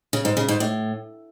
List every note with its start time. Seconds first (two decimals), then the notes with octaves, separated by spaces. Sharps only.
0.13 C#3
0.25 G#2
0.37 C#3
0.48 G#2
0.60 A2